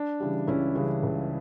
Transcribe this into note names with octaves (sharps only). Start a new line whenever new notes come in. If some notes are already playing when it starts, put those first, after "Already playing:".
Already playing: D4
C#3 E3 G3
C#2 C#4 E4
C#3 E3 G3
C#2